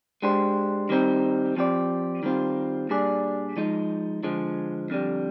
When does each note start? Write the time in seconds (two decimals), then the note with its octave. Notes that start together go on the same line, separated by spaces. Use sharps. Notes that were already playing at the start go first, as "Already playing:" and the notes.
0.22 G#3 D4 G4 C5
0.89 D#3 G3 C4 D#4
1.56 F3 C4 G4 D5
2.23 D#3 G3 C4 F4
2.89 A#2 G3 D4 G#4 D5
3.57 F3 G#3 D#4
4.23 D3 F3 G#3
4.90 F2 D3 G3